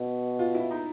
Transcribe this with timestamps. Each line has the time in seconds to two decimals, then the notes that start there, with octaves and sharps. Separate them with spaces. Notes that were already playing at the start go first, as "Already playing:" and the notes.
Already playing: B2
0.39 F4
0.55 E4
0.71 D#4